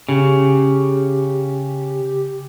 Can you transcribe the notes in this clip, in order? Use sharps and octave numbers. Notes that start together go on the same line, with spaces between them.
C#3 G4